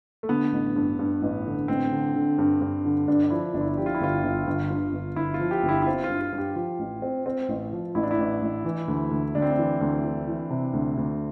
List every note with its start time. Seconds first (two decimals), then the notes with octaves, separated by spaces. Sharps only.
0.23 A3
0.29 D3 B3
0.52 A1
0.76 G2
0.99 G2
1.22 A1
1.46 D3
1.68 A1 C4
1.92 D3
2.14 D3
2.38 G2
2.61 G2
2.85 D3
3.08 G2 D4
3.24 D4
3.30 F3 E4
3.54 G1 D4
3.61 E4
3.69 D4
3.77 F3 G4
3.86 F4
3.95 E4
4.01 G1 F4
4.24 G1
4.47 G1
4.71 G2
4.93 G1
5.16 G1 E4
5.34 F4
5.40 F3
5.51 G4
5.63 G1
5.69 E4
5.82 E4
5.86 C4 F4
6.04 F4
6.09 G2
6.21 F4
6.32 G2
6.38 G4
6.56 F3 F4
6.79 A1
7.02 C4
7.26 C4
7.49 A1
7.72 F3
7.95 A1 E4
8.03 D4
8.11 E4
8.18 A1
8.42 A1
8.65 E3
8.88 D2
9.11 D2
9.35 D2 D4
9.42 C4
9.50 D4
9.57 E3
9.81 D2
10.04 E3
10.27 E3
10.50 C3
10.73 D2
10.97 D2